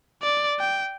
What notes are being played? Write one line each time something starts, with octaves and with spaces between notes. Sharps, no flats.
D5
G5